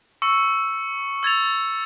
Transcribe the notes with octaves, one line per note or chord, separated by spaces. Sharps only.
C#6 E6 C#7
E6 G#6 A6 F7